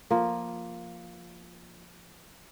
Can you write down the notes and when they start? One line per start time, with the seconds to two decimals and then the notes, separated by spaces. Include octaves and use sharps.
0.11 F3 A#3